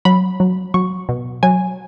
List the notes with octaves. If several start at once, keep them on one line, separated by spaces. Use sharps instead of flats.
F#3 B5
F#3
F#3 C#6
B2
F#3 G#5